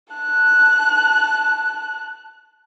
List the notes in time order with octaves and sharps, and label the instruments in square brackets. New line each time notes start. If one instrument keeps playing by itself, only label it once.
[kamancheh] A5 F#6